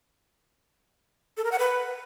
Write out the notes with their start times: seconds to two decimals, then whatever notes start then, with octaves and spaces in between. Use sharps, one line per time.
1.37 A4
1.44 A#4
1.52 F#5
1.59 B4